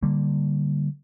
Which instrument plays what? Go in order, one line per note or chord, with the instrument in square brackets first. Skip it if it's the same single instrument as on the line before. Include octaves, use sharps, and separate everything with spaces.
[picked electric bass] D3 G3 A#3